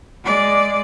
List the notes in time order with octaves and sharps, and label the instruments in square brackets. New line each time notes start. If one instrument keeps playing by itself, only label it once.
[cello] G#3 D5